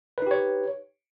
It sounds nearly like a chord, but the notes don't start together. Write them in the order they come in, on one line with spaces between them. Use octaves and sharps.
B4 D#4 G4 C#5